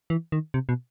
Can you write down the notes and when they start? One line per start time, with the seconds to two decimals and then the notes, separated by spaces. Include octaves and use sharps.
0.10 E3
0.32 D#3
0.54 C3
0.69 B2